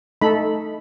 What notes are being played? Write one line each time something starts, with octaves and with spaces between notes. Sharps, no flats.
A3 D#4 A4 B5